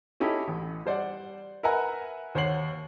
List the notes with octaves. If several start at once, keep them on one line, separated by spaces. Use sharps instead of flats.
C#4 D#4 E4 G4 A4
A1
G3 C5 D5 F#5
A#4 B4 E5 F#5 G#5 A#5
D#2 C5 C#5 F#5 C7 F#7